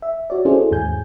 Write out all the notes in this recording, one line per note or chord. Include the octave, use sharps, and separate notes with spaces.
E5
F#4 C#5 D5
C#4 E4 F#4 G#4 A4 C5
D#2 G#2 G#5 G6